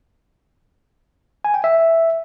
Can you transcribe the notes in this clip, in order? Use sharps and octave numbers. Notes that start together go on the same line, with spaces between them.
G#5
G5
E5